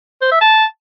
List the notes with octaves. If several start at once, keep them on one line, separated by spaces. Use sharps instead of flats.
C5
E5
A5